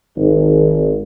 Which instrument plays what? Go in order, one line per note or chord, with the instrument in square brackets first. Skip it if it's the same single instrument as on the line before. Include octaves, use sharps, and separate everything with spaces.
[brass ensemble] G#1